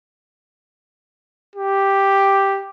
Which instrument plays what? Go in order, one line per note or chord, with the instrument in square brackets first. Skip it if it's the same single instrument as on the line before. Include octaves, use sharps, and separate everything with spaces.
[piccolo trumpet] G4